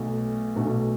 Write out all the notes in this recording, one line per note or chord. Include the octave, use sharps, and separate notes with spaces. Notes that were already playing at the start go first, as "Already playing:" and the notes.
Already playing: B1 B2 A3
B1 B2 A3